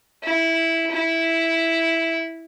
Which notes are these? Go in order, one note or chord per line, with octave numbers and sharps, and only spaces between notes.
E4
E4